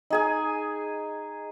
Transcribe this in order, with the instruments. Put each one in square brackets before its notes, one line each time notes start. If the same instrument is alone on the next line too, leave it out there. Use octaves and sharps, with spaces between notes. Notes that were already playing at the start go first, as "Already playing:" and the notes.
[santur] D#4 G#4 G#5